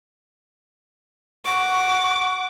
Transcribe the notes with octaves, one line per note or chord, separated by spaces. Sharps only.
F#5 C#6 D6